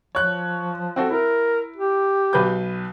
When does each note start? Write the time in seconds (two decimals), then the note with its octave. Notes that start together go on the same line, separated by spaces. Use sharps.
0.15 F3 C#5 F#6
0.96 C4 F#4 A4
1.10 E4 A#4
1.76 G4
2.33 B1 B4 G6